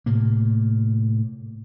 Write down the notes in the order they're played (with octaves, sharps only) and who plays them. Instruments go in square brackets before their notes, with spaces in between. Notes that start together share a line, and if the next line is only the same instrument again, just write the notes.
[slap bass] A2 C3 A#3